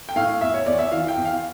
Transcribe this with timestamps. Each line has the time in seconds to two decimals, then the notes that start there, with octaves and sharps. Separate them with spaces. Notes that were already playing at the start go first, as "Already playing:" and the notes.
0.09 G5
0.16 A2 F5
0.41 E2 E5
0.54 C#5
0.66 E2 D5
0.79 E5
0.92 E3 F5
1.08 G5
1.17 E2
1.25 F5